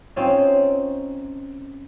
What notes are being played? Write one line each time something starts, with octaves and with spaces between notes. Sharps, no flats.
C4 C#4 D#4 F4